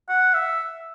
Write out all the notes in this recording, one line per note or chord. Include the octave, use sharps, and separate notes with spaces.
F#5
E5